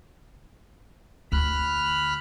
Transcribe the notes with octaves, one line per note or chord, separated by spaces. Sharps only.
D2 B5 F6 F#6